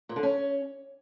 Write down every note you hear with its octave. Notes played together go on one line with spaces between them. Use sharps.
A#2
D3
C#4